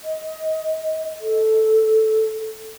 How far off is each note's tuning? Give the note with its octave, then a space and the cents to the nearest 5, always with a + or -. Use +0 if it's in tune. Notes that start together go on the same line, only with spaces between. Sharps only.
D#5 +20
A4 -5